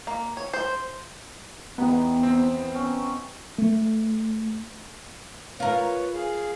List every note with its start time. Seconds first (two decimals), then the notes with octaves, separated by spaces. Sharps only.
0.07 A#3
0.37 C#5
0.53 C5
1.78 E2 B3 D#4 G4 B4
2.23 C4
2.75 C#4
3.58 A3
5.60 F4 A#4 B4 C#5
6.14 G#4 F5